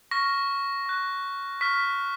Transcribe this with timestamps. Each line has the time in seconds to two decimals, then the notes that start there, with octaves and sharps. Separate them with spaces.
0.11 C#6 F6 A#6
0.86 C#6 F#6
1.61 C#6 F6 B6